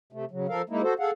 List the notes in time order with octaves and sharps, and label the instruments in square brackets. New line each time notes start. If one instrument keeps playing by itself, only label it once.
[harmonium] C3 A3
C#3 F#3
F3 A4 A#4 F5
G#3 A#3 D#4 E4
F#4 A4 C5
G#4 A4 F5 F#5